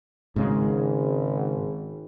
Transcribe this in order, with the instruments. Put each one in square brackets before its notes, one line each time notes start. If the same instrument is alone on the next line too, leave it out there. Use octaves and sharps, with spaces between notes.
[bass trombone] G#1 [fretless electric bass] G#2 C#3 G#3